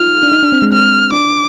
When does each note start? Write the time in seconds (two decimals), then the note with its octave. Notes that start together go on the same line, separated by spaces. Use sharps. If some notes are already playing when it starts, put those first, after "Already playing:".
Already playing: D#4 F4 F6
0.23 D4
0.32 D#4
0.43 D4
0.52 C4
0.62 G#3
0.72 C4 F6
1.12 D4 D6